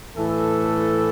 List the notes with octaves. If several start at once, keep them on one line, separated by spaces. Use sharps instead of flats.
A2 E3 A4